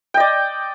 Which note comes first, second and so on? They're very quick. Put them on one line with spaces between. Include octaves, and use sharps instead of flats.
G5 D#5 D5